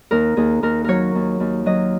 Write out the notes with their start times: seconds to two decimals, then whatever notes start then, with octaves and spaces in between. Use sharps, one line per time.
0.11 D#2 A#4
0.37 D#2 G#4
0.63 D#2 A#4
0.84 F#3 A#4 C#5
1.15 D#2
1.40 D#2
1.66 F#3 D#5